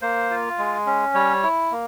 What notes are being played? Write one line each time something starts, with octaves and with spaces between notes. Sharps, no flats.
A#3 C5
F4
G#3
C#4
G3 C#5
E4
A#3